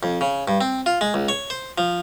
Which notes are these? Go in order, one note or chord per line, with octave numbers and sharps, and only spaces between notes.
F2
C#3
G2
C4
F4
G#3
C#2
C#5
C5
F3